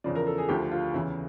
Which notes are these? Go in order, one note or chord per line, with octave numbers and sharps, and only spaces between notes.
E2 C#3 F3 D5
A#4
A4
G#4
D2 D3 F3 G4
F4
E2 C#3 E3 E4